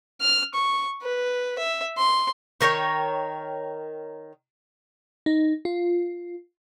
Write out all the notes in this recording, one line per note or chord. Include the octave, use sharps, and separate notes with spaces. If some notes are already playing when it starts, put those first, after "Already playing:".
F6
C#6
B4
E5
C6
D#3 A#4 C#5 G5
D#4
F4